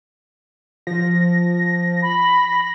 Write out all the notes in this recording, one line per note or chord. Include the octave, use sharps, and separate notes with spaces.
F3 A#6
B5